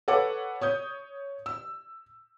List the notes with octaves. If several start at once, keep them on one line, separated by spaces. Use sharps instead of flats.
A4 B4 C#5 F#5 D6
C#5 D#6 G6
E6